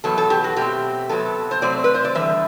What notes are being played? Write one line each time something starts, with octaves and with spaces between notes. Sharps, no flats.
E2 B2 F#3 B3 A4
A4
G4
F#4
B2 A3 C4 G4
C3 F#3 B3 A4
C5
C3 F#3 A3 C4 D5
B4
C5
D5
E2 D3 G3 E5